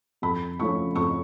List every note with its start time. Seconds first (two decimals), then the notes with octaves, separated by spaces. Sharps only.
0.22 F2 B5
0.60 F3 A3 C#4 C#6
0.96 F2 C#6